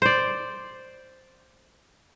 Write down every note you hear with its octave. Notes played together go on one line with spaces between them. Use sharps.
C5 D5